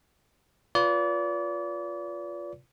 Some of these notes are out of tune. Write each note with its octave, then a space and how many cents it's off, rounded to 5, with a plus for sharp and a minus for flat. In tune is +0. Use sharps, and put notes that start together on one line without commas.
F4 +0 B4 -10 D5 -35